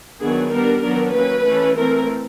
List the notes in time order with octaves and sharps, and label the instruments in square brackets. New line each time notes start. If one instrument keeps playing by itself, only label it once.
[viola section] D#3 F#3 B3 D4 G#4
G3 B3 D4 A#4
D#3 F#3 B3 D4 A#4
F#3 A#3 C#4 B4
E3 A3 C#4
E3 A3 C4 A#4